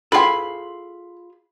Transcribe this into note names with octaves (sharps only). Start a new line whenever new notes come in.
E4 F4 G#4 A4 F5 G5 B5 C6